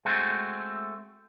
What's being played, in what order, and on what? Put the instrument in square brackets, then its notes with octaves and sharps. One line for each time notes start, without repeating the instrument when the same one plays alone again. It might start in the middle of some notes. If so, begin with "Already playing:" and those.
[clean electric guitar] G#3 A3 C4 F#4